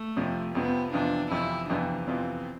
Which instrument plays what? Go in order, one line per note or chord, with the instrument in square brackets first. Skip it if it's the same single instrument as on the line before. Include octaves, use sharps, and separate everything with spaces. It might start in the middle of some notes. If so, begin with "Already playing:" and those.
Already playing: [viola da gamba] A3
[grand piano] F2 C3 F3
[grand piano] F2 C3 F3 [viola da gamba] B3
[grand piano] F2 C3 E3 B3 F4 [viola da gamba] D4
[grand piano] F2 C3 E3 B3 F4 [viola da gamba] E4
[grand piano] F2 C3 E3 B3 F4 [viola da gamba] D4
[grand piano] F2 C3 E3 B3 F4 [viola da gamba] C4